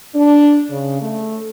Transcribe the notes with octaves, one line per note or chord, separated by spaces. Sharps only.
D4
C#3
A3